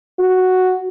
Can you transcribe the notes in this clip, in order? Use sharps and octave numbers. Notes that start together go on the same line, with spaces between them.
F#4